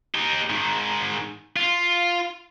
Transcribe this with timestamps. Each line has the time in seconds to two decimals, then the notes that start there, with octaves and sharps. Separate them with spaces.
0.15 D#4 G4
0.50 G#2 D#3
1.56 F4